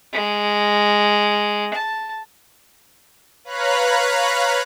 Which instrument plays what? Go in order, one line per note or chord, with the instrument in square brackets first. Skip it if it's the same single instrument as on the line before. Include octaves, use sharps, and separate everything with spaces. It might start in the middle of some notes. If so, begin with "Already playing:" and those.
[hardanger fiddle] G#3
A5
[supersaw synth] B4 C#5 F5 A#5 B5 F#6